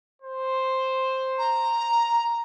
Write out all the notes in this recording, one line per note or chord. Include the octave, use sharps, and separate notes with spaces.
C5
A#5